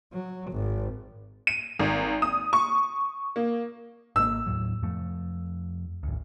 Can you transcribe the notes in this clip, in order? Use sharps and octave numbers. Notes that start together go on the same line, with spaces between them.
F#3
G#1
D#7
G#1
D#6
C#6
A#3
G#1 A#3 E6
D#2 A2 F#3
F2 F3 A3
G#1 D2